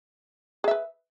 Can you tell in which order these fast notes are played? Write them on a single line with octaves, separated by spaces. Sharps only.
G#4 E5 B4